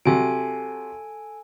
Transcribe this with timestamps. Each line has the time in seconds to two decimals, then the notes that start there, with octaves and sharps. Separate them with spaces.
0.05 C3 F#3 A4 G#5 D7